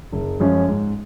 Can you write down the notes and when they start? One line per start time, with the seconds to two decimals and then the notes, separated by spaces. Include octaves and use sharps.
0.12 F#1
0.40 F#2 F3 G#3 C#4
0.69 G#2